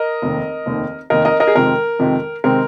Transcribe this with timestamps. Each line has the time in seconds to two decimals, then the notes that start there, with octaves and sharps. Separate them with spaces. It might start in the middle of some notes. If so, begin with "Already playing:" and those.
Already playing: A#4 D#5
0.22 F1 D#2 D#3
0.66 F1 D#2 D#3
1.10 F1 D#2 D#3 A#4 D#5
1.25 A#4 D#5
1.40 A#4 D#5
1.47 G#4
1.55 F2 C3 D#3 G#3 C4 A#4
1.99 F2 C3 D#3 G#3 C4
2.44 C3 D#3 G#3 C4 A#4